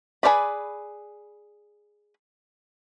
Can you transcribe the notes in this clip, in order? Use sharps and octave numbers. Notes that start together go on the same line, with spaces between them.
G#4 A#4 B4 D5 B5